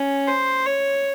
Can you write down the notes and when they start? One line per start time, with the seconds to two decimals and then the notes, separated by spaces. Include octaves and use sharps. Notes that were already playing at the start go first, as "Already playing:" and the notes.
Already playing: C#4
0.28 C5
0.66 C#5